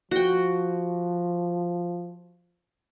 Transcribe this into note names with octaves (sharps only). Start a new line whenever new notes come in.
F3 F#4 G5